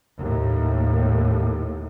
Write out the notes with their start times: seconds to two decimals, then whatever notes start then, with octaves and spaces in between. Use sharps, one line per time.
0.18 D#2 A2